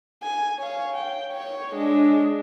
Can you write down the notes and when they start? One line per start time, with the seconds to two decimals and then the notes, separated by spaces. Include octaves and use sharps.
0.23 G#5
0.59 C#5 F5
0.94 G5
1.32 C#5
1.74 G#3 D4